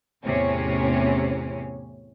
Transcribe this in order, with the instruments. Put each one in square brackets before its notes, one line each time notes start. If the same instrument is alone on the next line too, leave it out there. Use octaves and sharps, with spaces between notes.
[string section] E2 A2 C3 C#4